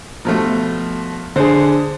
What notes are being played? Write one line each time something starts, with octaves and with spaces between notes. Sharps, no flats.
B2 F3 A3
D3 G#4 C5